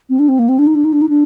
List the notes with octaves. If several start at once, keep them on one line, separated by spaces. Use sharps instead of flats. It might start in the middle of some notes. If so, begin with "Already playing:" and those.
C4
D4
C4
A#3
C4
D4
D#4
D4
D#4
D4
D#4
D4